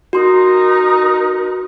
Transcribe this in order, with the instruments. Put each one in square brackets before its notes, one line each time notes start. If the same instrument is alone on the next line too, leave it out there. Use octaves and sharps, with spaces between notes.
[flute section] D#4 A#4 [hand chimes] F#4 C6